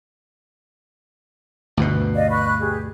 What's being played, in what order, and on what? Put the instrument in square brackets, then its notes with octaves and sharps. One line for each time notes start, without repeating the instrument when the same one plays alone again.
[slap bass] D2 G2 B2
[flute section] D5 D#5 F5
B5 C#6 F#6
G4 G#4